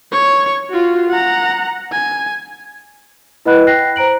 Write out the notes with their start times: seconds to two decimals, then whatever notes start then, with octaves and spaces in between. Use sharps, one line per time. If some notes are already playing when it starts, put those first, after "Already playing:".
0.12 C#5 C#6
0.70 F4 F#4
1.09 F#5 A#5
1.92 G#5
3.46 E4 B4 D#5 F#5 B5 F#6
3.67 G5 F#6 A#6 C7
3.96 C5 A#5 D7 F#7